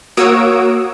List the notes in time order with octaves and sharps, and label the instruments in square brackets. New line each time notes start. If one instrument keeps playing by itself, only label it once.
[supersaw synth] A#3 F#4 C#5 D#6 E6 D7